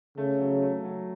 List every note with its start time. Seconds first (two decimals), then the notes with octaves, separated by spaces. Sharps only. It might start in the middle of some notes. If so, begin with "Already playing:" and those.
0.17 C#3 A3
0.39 F#3
0.62 A3
0.84 F#3